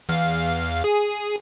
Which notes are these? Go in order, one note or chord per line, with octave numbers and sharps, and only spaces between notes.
E2 F5
G#4